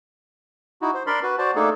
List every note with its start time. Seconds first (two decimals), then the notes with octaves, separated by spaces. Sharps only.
0.82 D#4 E4 F#4
0.94 C5
1.07 D4 A#4 D5 B5 C6
1.23 F#4 B4
1.38 F#4 C5 D5 A5
1.55 A3 A#3 D4 D#4 G#4 A4